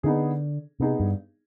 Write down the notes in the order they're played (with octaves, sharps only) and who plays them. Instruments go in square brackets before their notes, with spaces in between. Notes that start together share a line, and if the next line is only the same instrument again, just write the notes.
[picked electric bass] D3 [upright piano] B3 D#4 G#4
[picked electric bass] C3 [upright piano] B3 D#4 G#4
[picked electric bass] G2